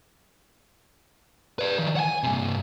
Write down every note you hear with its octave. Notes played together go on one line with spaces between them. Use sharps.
B4 D5
D#3 E3
F#5 G#5
G2 C3